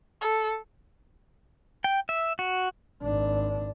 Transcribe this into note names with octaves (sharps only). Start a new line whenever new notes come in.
A4
G5
E5
F#4
G#1 D4